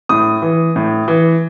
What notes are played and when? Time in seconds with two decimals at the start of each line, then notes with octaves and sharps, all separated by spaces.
0.09 A2 D#6
0.42 E3
0.76 A2
1.08 E3